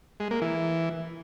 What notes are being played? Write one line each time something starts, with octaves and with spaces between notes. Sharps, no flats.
G#3
A#3
E3